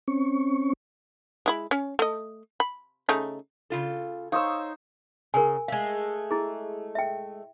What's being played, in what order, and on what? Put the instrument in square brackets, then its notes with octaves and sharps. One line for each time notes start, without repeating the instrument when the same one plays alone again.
[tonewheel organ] C4 C#4 C#6
[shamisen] G#3 E4 B5
C#4
A3 D#5
B5
C#3 A3 D#4
[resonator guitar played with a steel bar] C#3 F4 A4
[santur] D#4 C5 E6 [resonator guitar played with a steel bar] C#5 [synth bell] F5 C#6 D#6
[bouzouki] C#3 [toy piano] A#4 G#5
[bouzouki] G#3 A3 [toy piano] F5
[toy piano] E4 G#4
E5 G5